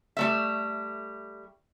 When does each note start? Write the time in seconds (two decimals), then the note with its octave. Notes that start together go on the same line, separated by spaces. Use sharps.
0.17 G3 A3 E5